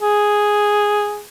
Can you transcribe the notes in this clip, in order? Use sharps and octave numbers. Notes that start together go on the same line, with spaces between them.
G#4